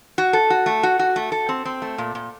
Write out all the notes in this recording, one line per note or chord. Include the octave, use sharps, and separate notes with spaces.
F#4
A4
F#4
A3
F#4
F#4
A3
A4
C4
C4
A3
A#2
A#2